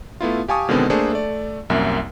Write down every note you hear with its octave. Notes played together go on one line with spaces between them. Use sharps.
A3 B3 E4 F4
G4 F5 G#5 A5 C#6 D#6
B2 D3 D#3 G#3 B3 C4
A3 A#3 D4 G#4 A4 C5
A3 D5
C2 F#2 A#3 E5